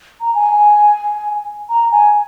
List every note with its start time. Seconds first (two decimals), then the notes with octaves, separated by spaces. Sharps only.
0.21 A#5
0.35 G#5
1.70 A#5
1.92 G#5